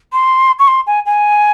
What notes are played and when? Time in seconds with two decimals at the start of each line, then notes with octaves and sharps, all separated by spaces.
0.13 C6
0.59 C#6
0.68 C6
0.87 G#5
1.06 G#5